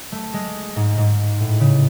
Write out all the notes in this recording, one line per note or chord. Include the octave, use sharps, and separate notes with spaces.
A3
G#3
G#2
G#2
A2
C#3